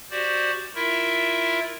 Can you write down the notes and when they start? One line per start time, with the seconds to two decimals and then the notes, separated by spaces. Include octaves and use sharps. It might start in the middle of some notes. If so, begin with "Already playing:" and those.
0.11 F#4 G4 C5 D5
0.75 E4 F4 A#4 E5